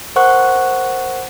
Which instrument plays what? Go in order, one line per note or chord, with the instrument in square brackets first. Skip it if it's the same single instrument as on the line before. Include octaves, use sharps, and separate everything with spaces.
[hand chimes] A#4 C5 F#5 C#6 F#6